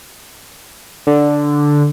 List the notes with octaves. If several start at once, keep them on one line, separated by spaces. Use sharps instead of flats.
D3